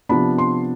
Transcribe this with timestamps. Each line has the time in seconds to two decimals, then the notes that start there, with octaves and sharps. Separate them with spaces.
0.09 C3 F3 B3 D4 B5
0.38 C6